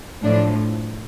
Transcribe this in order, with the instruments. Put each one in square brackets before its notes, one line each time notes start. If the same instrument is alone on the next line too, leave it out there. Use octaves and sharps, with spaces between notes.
[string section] A2 F3 D4